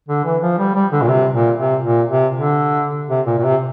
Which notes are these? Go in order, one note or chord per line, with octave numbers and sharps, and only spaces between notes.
D3
E3
F3
G3
G3
D3
A#2
C3
A#2
C3
A#2
C3
D3
C3
A#2
A#2
C3